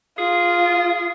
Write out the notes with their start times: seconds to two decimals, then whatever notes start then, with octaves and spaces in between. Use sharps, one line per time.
0.18 F4 G#4